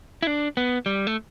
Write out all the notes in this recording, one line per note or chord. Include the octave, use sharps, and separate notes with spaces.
E4
D4
B3
G3
A3